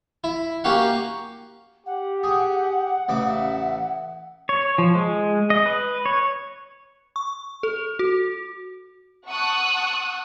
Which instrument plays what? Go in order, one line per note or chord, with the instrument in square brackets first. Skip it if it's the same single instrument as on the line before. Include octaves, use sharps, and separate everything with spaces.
[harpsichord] E4
A#3 C#4 F#4 G4 F5 F#5
[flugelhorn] G4 [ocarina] F#5
[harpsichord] G#4
[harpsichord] A1 C#3 D6 [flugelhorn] E5
[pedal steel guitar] C#5
F3
G#3
D#5
B4
C#5
[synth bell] C#6
A4
F#4
[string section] F#5 A5 C#6 D#6 E6 F#6